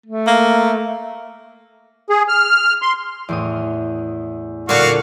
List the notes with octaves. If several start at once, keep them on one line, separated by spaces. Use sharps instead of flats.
A3
A#3
G#4
F6
C6
E2 A2 D#6
A#2 D3 F#4 F5 C#6